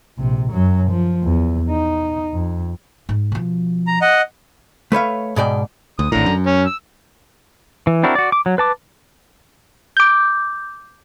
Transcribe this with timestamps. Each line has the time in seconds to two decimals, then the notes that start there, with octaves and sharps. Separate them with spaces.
0.18 A#1 C3
0.52 F#2 F#3
0.90 F3
1.24 E2
1.70 D#4
2.33 F2
3.09 G#2
3.32 B2 F3
3.87 A#5
4.01 D#5 F#5
4.92 A3 B4 C#5 F5
5.36 G#2 B2 D5 G5
5.99 D2 D#6
6.12 G#1 A2 D3 A#5
6.26 F#2
6.46 C#4
6.66 E6
7.87 E3
8.03 C4 D4 E4 F#4 A#4
8.15 F#4 D5
8.32 D6
8.46 F#3
8.58 B4 A5 D6
9.97 D6 G6